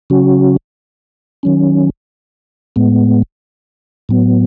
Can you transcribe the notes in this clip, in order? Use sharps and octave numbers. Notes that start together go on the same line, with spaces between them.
C#3 F#3 C#4 F#4
D#3 F#3 C#4
A2 G#3 B3
A2 F#3 B3